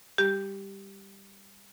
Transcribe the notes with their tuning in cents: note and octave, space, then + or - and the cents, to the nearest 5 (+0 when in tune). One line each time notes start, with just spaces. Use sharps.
G3 +15 G4 +0